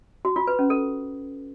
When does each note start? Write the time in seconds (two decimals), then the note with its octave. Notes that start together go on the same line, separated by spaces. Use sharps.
0.25 F#4
0.36 F4
0.47 B4
0.59 C#4
0.70 A4